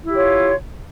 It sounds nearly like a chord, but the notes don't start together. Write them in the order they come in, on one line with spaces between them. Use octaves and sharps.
E4 G4 F4 C#5